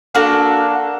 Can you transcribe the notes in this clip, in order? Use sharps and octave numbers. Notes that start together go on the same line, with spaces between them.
A#3 D4 F#4 A4